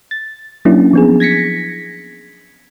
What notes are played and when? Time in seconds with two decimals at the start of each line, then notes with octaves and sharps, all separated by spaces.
0.11 A6
0.65 F#3 A#3 C#4 D4 E4
0.93 F3 B3 G#4
1.20 G#6 A#6 B6 C#7